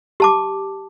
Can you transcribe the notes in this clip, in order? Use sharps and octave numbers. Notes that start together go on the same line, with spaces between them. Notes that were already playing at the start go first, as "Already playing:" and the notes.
G4 A5 D6